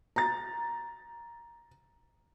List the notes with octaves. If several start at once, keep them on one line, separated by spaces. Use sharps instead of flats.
A#5 A6